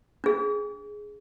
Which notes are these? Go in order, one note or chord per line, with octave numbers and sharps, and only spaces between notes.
D4 G#4